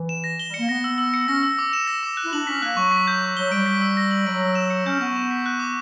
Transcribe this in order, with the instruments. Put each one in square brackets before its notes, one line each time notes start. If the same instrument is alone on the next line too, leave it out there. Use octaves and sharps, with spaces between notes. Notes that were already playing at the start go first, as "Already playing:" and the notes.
Already playing: [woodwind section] E3
[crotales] E7
A#6
G7
[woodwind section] G3
[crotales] C#7
[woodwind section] A#3
[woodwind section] B3 [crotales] A#6
[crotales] E6
E6
C#7
[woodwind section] C#4 [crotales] A#6
[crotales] E6
D6
E7
A#6
D6
F#6
[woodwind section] E4
[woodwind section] D4 [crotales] F#7
[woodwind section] C#4 [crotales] B6
[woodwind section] A#3 [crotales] F#6
[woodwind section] F#3 [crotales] C#6
[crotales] B6
G6
C#6
[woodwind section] F#3 [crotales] G7
[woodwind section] G3 [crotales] D7
[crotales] B6
E6
A#6
F#7
[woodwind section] F#3 [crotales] D7
[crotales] A#6
E7
C#7
[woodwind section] C#4 [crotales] G6
[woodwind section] B3 [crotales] C#6
[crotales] E7
B6
F#6
D6